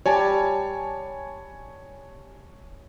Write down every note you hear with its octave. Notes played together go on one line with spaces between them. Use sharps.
G3 C#5 G#5 A5